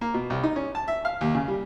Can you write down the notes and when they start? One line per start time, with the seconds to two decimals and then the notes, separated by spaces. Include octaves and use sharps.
0.01 A#3
0.14 B2
0.30 C2
0.43 D#4
0.56 C#4
0.75 A5
0.88 E5
1.05 F5
1.21 D#2
1.34 C#3
1.48 G3